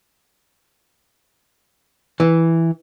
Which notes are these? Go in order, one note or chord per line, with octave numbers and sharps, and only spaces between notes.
E3